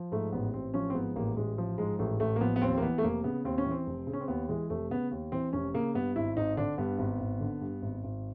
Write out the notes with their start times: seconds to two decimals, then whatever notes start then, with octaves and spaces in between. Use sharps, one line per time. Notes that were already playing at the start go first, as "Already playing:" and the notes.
Already playing: F3
0.12 G#2 A3
0.32 A1 B3
0.53 A1 C4
0.74 F3 C#4
0.90 C4
0.94 G#2 B3
1.16 A1 A#3
1.37 A1 G#3
1.58 F3
1.78 G#2 G#3
1.99 A1 A3
2.20 A1 A3
2.36 A#3
2.41 F3 B3
2.56 B3
2.61 D#2 C4
2.78 A#3
2.82 E3 B3
2.98 A3
3.03 F1 A#3
3.24 C#3 B3
3.45 D#2 C4
3.58 C#4
3.66 E3
3.71 C4
3.87 F1
4.07 C#3
4.13 C#4
4.21 C4
4.28 D#2 B3
4.49 E3 G#3
4.70 F1 A3
4.90 C#3 B3
5.11 D#2
5.32 E3 C4
5.53 F1 C#4
5.74 C#3 A#3
5.94 G2 B3
6.16 G#1 E4
6.37 G#1 D#4
6.57 D3 D4
6.78 G2 B3
6.99 G#1
7.20 G#1
7.40 D3
7.61 G2
7.82 G#1
8.04 G#1